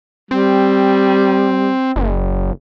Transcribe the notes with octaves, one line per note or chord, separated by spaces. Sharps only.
G3 C4
F#1